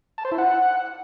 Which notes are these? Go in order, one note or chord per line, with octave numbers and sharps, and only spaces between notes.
A5
C5
E4
F#5